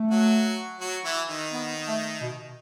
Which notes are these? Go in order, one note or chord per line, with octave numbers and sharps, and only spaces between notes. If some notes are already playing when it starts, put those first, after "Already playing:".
Already playing: A3
F#3 F#4
F#3 F#4
E3 E4
D#3 D#4
B3
A3
B2